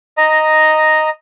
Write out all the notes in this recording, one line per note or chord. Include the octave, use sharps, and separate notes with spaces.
D#5 A#5